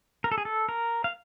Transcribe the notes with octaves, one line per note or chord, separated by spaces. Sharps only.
A#4
A4
G#4
A4
A#4
F5